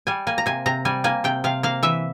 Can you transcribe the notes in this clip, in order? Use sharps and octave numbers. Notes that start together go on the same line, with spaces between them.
G3 G#5
A#3 G#5
A#5
C3 G#5
C3 A#5
G3 G#5
A#3 G#5
C3 G5
C3 F5
A#3 F5
E3 E5